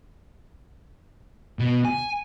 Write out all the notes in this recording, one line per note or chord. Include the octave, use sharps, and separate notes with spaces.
B2
G#5